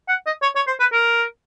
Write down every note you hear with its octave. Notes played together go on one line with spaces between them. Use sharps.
F#5
D#5
C#5
C#5
C5
B4
A#4